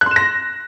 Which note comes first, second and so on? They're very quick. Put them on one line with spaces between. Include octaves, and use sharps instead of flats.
F#6 C6 E7 A#6